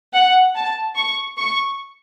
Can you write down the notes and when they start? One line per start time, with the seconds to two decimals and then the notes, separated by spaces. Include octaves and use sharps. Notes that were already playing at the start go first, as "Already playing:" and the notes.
0.14 F#5
0.55 A5
0.96 C#6
1.38 C#6